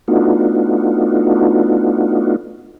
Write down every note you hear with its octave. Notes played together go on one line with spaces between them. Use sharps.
A3 B3 D4 D#4 F4 F#4